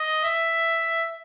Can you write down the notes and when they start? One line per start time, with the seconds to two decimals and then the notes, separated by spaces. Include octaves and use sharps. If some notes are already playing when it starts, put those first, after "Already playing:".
Already playing: D#5
0.24 E5